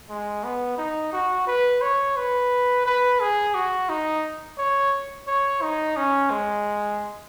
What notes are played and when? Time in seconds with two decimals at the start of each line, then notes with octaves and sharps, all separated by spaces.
0.09 G#3
0.44 B3
0.78 D#4
1.13 F#4
1.47 B4
1.82 C#5
2.17 B4
2.86 B4
3.20 G#4
3.55 F#4
3.89 D#4
4.58 C#5
5.27 C#5
5.62 D#4
5.97 C#4
6.31 G#3